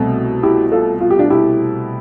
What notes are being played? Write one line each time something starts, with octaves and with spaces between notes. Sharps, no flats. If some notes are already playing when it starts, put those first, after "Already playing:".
Already playing: C2 B2 A3 C4
E4 G4
F4 A4
F4
G4
D4 F4
E4 G4